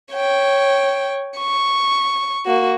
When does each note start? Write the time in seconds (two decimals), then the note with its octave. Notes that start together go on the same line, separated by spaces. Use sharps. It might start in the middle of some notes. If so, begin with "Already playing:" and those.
0.13 C#5 G5
1.39 C#6
2.46 A#3 F#4